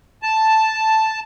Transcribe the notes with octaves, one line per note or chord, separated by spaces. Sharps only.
A5